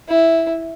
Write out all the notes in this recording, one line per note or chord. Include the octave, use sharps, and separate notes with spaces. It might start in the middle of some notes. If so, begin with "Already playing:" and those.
E4